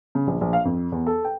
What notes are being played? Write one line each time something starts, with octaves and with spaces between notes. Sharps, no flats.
C#3
A#1
A#1
F5
F2
E2
A4
G5